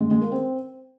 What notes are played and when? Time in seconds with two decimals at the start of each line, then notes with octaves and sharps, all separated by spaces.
0.01 G#3
0.11 G#3
0.21 A#3
0.32 C4